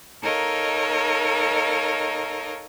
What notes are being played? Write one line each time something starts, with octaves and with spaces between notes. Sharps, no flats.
D#4 A4 A#4 C#5 D#5 F5